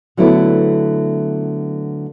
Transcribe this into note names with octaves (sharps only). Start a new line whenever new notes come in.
D3 F#3 A3 B3 E4